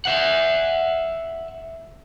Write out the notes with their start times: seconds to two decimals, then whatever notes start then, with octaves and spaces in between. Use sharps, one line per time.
0.05 E5 F#5